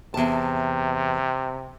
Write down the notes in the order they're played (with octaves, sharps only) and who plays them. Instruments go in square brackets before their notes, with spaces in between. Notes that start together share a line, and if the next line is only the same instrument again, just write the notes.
[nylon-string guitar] E2 A5 [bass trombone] C3